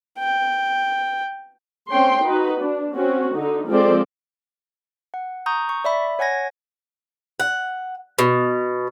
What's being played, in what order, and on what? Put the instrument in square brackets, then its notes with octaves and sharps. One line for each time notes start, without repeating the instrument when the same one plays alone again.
[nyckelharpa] G5
[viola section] C4 C#4 C#5 G5 C6
D#4 F#4 B4
D4
C4 C#4 F#4
D3 D#4
F3 G#3 C4 A4 C5 D5
[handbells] F#5
A#5 C#6 D#6 G6
C#6
D5 E5 B5
C#5 F#5 G#5 G#6 A#6
[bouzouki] F#5
B2